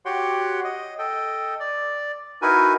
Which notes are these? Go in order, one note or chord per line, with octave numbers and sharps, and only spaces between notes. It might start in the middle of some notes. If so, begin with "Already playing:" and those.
F#4 G4 C#5 F#5 G5 C6
D#5
A4 D#5 G5
D5
D#4 E4 F#4 A#4 B4 G#5